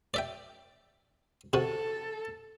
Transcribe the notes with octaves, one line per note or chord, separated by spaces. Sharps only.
D5 E5 G5
C3 F#4 A4